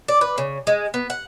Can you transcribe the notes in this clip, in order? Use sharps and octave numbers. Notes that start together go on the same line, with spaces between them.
D5
B4
C#3
G#3
B3
F#5